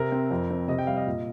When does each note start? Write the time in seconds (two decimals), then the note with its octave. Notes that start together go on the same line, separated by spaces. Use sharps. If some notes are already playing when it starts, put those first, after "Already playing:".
Already playing: C3 A#4
0.12 C4
0.31 F2
0.50 C4
0.68 C3 D#5
0.79 G5
0.87 G3 F5
0.96 D#5
1.07 A#2